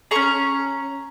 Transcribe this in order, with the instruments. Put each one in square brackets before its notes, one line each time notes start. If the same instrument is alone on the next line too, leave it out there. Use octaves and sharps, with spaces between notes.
[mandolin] C#4 G#4 A#5 C#6